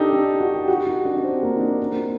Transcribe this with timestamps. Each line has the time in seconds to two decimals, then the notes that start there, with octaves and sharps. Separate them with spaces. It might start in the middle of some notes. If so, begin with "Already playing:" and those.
Already playing: D4 D#4 G4 A4
0.13 D4
0.40 F#4
0.54 G4
0.68 F#4
0.87 D#4
1.05 D4
1.17 D4
1.24 C4
1.43 A#3
1.57 D#4
1.61 D4
1.80 C4
1.92 A#3